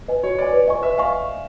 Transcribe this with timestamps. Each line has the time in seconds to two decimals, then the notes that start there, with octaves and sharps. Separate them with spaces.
0.08 B4 D#5 G#5
0.23 F#4 C#5
0.38 B4 D5 D#5 G#5
0.53 B4
0.68 D#5 G#5 C#6
0.82 B4 E5
0.97 D#5 F5 G#5 C#6